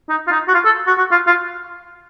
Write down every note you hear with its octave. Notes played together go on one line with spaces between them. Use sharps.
D#4
F4
D#4
F#4
F4
A4
F#4
F#4
F4
F4